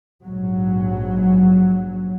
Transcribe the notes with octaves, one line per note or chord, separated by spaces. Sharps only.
A#1 G#2 F#3